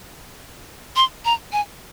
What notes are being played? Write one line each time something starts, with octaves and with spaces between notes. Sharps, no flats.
C6
A#5
G#5